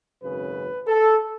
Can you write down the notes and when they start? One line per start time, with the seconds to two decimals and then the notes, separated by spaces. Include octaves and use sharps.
0.22 G#1 F#2 C#3 B4
0.87 A4